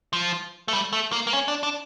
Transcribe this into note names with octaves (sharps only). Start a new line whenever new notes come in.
F3
A3
G3
A3
A#3
A#3
C#4
D4
D4